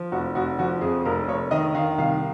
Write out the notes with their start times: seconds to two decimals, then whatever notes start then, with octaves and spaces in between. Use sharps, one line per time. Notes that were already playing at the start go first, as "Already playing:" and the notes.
Already playing: F3
0.12 F1 F#4
0.35 F1 F#4
0.59 F3 F#4
0.81 F2 G#4
1.05 F1 A#4
1.28 F1 C#5
1.51 D#3 D#5
1.75 D#3 F5
1.98 C2 F5